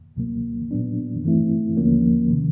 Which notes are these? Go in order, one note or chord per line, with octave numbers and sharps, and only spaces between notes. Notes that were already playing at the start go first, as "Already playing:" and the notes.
C#2 B2 F#3 A#3
A#2 F#3 B3 D4
G2 E3 A3 C4 E4
D#2 D3 F3 A#3 C#4
C3 D#3